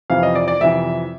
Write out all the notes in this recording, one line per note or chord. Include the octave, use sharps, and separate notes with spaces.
F2 C3 E3 F5
D#5
D5
D5
F2 C3 E3 E5